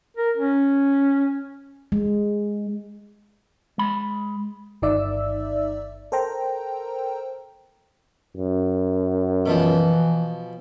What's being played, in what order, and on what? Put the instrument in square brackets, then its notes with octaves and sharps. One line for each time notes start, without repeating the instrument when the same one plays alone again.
[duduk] A#4
C#4
[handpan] G#3
[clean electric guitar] G#3 B5
[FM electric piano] G1 D#3 D#4 D5 E5 E6
A4 A#4 C5 G5 A#5
[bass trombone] F#2
[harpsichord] B2 F3 [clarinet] E3